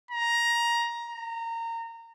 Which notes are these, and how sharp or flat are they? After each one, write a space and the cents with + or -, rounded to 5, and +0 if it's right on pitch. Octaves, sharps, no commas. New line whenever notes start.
A#5 +15
A#5 -25